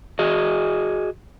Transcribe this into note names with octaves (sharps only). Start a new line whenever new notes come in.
F#4 G#4 D#5